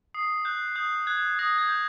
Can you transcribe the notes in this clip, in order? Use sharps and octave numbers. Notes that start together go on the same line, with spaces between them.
D#6 C7
F#6 G6
D#6 G6
F#6 G#6
D#6 A#6
G#6
G6